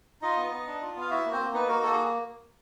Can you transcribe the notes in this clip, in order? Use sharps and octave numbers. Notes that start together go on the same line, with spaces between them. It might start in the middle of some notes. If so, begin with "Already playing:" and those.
D#4 F4 D#5
B3
B3
D4
F4
B3
F5
E4 F#4 E5
A#3
C4 C5
A#3
B3 D#4 B4
A#3 F#4 A#4
A#3 A4
G#4